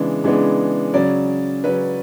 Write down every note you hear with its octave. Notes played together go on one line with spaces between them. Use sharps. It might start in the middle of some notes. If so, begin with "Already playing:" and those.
Already playing: C#3 E3 G#3 B3 D4
C#3 E3 G#3 B3 D4
C#3 F#3 C#4 D5
C#3 F#3 C#4 B4